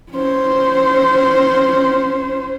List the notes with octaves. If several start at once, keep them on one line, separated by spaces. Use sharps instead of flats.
C#4 C5